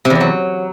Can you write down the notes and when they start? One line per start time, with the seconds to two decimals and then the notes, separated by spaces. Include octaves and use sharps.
0.05 C3
0.10 E2
0.15 C3
0.20 F#3